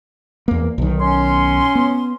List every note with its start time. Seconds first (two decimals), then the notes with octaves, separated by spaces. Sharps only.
0.48 E2 A#3
0.78 B1 D#3
1.01 C#4 C6
1.75 B3